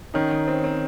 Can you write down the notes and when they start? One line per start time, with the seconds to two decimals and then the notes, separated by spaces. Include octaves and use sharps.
0.14 D#3 C#4 D#4
0.31 D#3
0.48 C4
0.64 C4